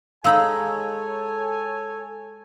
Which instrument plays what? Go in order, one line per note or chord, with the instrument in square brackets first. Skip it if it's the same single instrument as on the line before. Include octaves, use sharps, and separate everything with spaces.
[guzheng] G#3 D#4 B5 [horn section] A4 C#5 G#5 [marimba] F5 E6